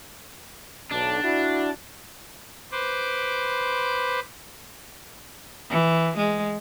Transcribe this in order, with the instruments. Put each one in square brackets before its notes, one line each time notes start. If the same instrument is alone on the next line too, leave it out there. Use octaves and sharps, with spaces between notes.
[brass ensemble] B1 [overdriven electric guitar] D4
[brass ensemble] E4 F#4
[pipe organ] B4 C5 D6
[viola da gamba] E3
G#3